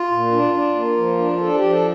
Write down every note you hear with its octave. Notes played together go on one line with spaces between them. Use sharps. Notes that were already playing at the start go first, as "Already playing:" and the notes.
Already playing: F4
A#2
D4
D4
A#3
F3
D4
D4 A4
F3 G4
A4